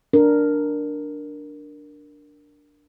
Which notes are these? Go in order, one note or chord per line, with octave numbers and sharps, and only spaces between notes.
D4 A#4